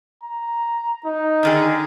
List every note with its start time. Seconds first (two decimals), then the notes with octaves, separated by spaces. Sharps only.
0.23 A#5
1.05 D#4
1.43 D3 D#3 G#4